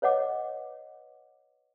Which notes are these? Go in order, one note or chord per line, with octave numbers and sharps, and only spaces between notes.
B4 C#5 D#5 F#5 D6